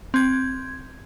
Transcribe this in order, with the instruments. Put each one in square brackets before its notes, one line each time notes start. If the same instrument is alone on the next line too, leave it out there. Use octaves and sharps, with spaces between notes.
[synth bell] C4 G#6